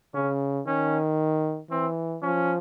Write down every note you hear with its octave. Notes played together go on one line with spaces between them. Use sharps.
C#3 C#4
D#3 C#4
E3 C4
F3 C#4